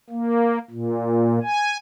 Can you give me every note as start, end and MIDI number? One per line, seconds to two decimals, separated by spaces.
0.10 0.59 58
0.71 1.39 46
1.43 1.77 80